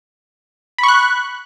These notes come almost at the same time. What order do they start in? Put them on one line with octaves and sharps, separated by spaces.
B5 C#6 F#6